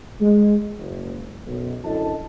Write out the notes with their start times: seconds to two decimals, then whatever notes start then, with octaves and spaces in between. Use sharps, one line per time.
0.21 G#3
0.78 F#1
1.47 B1 F#2 B2
1.84 F#2 D3 E4 A4 D#5 A5